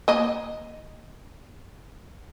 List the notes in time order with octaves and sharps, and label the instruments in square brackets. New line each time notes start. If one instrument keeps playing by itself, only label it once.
[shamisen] A#3 D#5